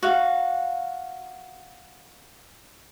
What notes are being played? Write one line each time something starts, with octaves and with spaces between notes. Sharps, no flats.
F#4 F5